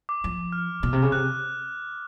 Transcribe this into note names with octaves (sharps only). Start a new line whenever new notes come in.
D6
F3
F6
B2
C3
C#3
C3 F#6